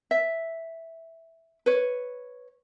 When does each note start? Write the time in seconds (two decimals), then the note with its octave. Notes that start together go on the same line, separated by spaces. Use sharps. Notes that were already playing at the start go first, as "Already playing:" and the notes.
0.11 E5
1.66 B4 C#5